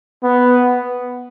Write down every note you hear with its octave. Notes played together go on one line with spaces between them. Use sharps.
B3